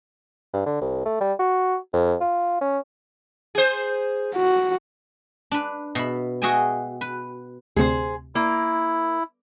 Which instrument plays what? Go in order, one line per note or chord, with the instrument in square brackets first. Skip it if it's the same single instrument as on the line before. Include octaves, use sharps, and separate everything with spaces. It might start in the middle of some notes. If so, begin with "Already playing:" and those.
[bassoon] G2
D3
C2
A3
G3
F#4
F2
F4
C#4
[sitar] G#4 C5
[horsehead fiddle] F#4
[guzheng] D4 B4
B2 E5 B5
F#4 G#4 D#5 E5 G5 G#5
B4
[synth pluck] D2 C3 [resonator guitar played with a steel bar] G#4 A4 C5
[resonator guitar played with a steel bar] A#3 [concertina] E4